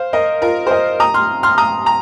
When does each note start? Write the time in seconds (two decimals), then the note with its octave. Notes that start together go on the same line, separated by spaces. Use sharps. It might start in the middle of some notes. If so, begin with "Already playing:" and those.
Already playing: C5 F5
0.13 A#4 D#5
0.42 F4 A#4
0.67 C5
0.71 A#4 D#5
1.00 A#5 D#6
1.14 C6 F6
1.43 C6 F6
1.58 A#5 D#6
1.86 A#5